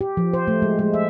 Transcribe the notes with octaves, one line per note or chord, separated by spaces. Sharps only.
G4
F3
C5
A3
G#3
G#3
E5